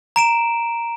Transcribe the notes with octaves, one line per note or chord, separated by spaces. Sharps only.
A#5 D7 E7